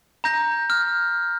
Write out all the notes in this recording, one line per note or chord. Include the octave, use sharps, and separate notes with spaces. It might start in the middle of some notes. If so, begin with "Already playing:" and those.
A#5 G6 A#6
F6